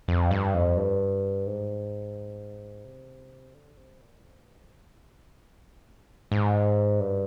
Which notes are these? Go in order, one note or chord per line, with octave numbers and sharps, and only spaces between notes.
F2
G2
F2
G2
G#2
C3
D3
C3
A#2
F2
G2
F2
G#2
G2